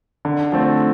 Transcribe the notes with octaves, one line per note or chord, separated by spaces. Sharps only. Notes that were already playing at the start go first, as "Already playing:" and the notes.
D3
F3 A3 C4